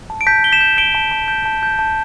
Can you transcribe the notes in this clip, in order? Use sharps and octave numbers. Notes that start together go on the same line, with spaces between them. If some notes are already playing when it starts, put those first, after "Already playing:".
A5
D7
A5 G6 B6
A5 G7
B6 E7
G6
G6 D7 G7
A5
A5
G6
A5
G6
A5